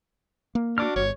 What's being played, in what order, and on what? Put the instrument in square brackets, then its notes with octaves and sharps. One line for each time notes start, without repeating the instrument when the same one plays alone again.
[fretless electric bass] A#3
[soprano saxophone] D4 [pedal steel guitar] F#4 D6 F6
[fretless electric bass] G1 [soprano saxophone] C#5